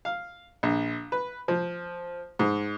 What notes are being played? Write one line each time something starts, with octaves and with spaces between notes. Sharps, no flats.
F5
A#1
B4
F3
G#2